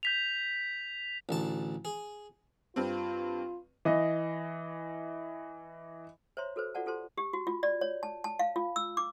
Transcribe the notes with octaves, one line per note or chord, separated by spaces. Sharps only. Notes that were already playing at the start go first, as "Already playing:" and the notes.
G6 B6 F7
A1 D2 A5
G#4
G2 C4 F4
E3 D#5
C5 C#5 E5 A#5 C6
F#4 A4 B4 C5
F4 F#4 A4 D5 F#5 A5
F4 G4 A4 C5 A5 C6
G4
F#4
F4
D5
C#5
A5
A5
F5
F4
E6
D6